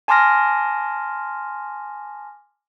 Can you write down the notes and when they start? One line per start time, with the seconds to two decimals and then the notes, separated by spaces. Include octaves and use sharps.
0.08 G#5 A5 C6 D6 F6 A#6